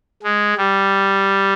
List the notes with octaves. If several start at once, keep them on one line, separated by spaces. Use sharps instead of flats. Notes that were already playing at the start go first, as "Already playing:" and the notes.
G#3
G3